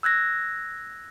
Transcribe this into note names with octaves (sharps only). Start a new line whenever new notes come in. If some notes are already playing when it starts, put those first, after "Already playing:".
E6 F#6 G#6 A#6